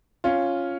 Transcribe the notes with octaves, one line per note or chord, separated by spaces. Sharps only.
C#4 F4